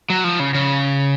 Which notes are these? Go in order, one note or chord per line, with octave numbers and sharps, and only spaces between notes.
F#3
F3
C#3
C#3